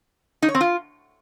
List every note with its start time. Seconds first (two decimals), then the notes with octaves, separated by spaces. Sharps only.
0.42 D#4
0.49 C#5
0.55 C4
0.61 F4